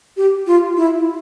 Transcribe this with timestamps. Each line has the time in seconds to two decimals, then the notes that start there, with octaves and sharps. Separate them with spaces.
0.17 G4
0.47 F4
0.77 E4